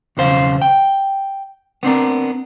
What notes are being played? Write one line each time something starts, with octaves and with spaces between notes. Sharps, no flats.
B1 E2 C#3 C5 F5
G5
B3 C4 D4 A#4